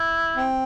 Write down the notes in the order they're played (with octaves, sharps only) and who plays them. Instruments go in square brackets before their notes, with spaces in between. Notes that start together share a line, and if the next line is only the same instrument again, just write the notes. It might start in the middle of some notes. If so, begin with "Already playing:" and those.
Already playing: [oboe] E4
[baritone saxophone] C4